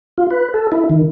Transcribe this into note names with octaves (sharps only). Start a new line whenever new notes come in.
F4
B4
A4
E4
D#3